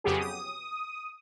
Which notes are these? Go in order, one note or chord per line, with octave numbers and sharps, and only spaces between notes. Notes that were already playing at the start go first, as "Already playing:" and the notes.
F2 C#3 F#3 B3 G4 G#4
D#6